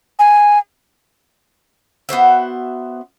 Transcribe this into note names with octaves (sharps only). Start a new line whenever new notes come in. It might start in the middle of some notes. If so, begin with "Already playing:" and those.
G#5
B3 F#4 C5 E5